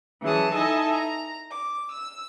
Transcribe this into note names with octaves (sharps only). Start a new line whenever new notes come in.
E3 F#3 C#4 G#4 A5 D#6
D#4 E4 A4 D#5 G#5 A5
A#5
D6
E6